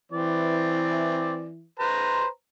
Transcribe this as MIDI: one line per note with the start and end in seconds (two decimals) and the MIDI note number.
0.12 1.65 52
0.12 1.47 60
0.12 1.47 74
1.79 2.26 71
1.79 2.26 72
1.79 2.26 82